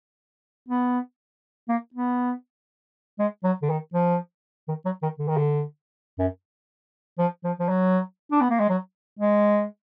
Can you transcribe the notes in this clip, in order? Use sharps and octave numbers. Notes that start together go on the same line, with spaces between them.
B3
A#3
B3
G#3
F#3
D3
D#3
F3
D#3
F#3
D#3
D3
D#3
D3
F#2
F3
F3
F3
F#3
D4
B3
A#3
G#3
F#3
G#3